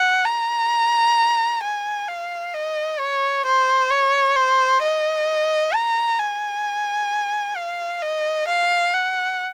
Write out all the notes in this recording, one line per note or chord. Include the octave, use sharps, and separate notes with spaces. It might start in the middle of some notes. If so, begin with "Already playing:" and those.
Already playing: F#5
A#5
G#5
F5
D#5
C#5
C5
C#5
C5
D#5
A#5
G#5
F5
D#5
F5
F#5